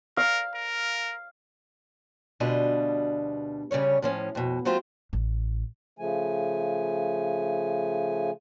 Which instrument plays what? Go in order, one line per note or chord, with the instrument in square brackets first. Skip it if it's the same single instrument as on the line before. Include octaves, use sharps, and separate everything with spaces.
[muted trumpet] A#4 [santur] F5
[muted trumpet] A#4
[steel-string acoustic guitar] D2 B2 G3 D4 F4 D#5
D2 C#3 G3 C#4 C#5
A2 F3 C#4
F2 B2
F#3 A3 C4 F4 G4 C5
[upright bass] A1
[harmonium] C#3 F3 A3 G#5